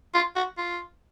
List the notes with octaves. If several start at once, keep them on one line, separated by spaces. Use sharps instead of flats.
F4
F#4
F4